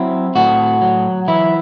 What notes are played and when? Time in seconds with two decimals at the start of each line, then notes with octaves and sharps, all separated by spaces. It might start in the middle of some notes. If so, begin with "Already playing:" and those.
Already playing: F#3 C4 E4
0.35 A2 F#4
0.82 F#3
1.28 E3 E4